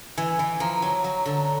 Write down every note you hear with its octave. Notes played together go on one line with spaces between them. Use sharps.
E3 G#5
E3
F3 A#5
F#3
F#3
D3